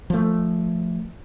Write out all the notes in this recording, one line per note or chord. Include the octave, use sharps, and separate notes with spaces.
F3 A3